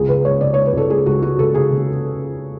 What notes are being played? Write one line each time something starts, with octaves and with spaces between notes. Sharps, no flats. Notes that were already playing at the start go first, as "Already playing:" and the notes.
Already playing: C#2 G#4
C#3 B4
G#3 C#5
C#3 D5
G#3 C#5
B4
C#2 A4
G#3 G#4
C#2 F#4
G#3 F#4
C#2 A4
C#3 G#4
C#3